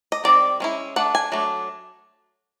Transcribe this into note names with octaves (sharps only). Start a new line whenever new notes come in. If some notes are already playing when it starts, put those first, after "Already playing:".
D#5
D#3 G3 C4 D5
G#3 C#4 E4
A3 D4 F#5
G#5
F#3 A3 D4